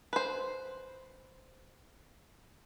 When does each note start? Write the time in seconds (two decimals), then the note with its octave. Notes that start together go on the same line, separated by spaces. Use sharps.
0.13 B4 C5